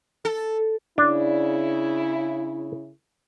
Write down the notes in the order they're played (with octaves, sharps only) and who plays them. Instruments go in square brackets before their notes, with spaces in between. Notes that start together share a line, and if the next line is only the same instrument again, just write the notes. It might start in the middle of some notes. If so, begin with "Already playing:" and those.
[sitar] A4
[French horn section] C#3 E4 [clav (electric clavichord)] D4